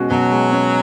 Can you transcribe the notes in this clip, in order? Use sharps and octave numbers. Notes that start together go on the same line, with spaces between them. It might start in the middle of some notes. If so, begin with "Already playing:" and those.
Already playing: B2 G#3 C#4 F#4
B2 F#3
G#3
C#4